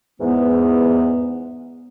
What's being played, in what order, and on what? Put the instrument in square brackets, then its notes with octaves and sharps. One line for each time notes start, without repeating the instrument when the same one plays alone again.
[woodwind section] E2 G#2 E3 B3